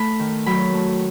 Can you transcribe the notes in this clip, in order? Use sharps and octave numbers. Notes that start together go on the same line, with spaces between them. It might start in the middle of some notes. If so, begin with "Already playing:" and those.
Already playing: A3 B5
D#3
F#3 B5
A3